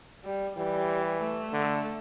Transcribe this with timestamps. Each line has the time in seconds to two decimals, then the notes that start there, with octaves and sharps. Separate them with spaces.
0.24 G3
0.56 E3 G3
1.21 A3
1.52 D3